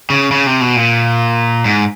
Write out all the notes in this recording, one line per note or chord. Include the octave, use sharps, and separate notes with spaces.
C#3
C#3
C3
B2
A#2
G#2